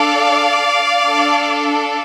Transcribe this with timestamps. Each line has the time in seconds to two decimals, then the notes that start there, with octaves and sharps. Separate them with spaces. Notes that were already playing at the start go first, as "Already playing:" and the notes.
Already playing: D4 A4 D5 F5
1.07 D4 A4